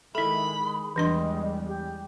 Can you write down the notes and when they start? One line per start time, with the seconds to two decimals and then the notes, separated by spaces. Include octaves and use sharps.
0.15 D#3 G#3 E4 A4 E5 B5
0.59 G#4
0.96 E2 E3 G3 G#3 D4 D#5 C6
1.67 G4